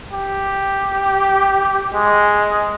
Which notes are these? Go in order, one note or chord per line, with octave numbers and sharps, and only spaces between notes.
G4
G#3